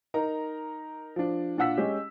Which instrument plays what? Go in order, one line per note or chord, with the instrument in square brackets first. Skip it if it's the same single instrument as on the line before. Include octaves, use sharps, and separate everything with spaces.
[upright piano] D#4 A#4 A#5
F3 D4
A#2 D4 F4 F#5 E6 B6
G#3 C#4 G4